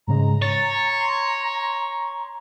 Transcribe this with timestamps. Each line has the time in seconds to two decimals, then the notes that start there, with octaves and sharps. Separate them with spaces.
0.07 G#2 C#3 G#3 A#5
0.42 C#5 A6
1.00 C6